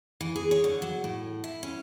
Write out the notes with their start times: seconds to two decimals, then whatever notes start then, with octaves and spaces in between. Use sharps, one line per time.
0.21 E3
0.36 G#4
0.51 C#5
0.64 D3
0.82 F#3
1.04 A2
1.44 E4
1.63 C#4